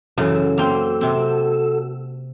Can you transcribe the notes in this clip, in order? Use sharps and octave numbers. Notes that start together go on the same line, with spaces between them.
F#2 C#3 E3 F#4 A4 E6
A#3 C4
C3 C4